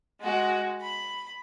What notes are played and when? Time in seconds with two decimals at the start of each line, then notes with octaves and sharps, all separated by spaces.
0.21 G#3 F#4
0.81 B5